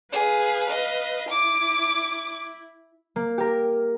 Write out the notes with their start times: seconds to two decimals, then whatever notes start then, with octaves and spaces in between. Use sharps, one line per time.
0.12 G#4 B4 F5
0.70 D#5
1.30 E4 D6
3.16 A#3
3.38 G4 A#4